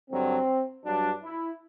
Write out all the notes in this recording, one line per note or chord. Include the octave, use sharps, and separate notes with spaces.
G2 D3 F#3 C4
G2 F#3 D4
E4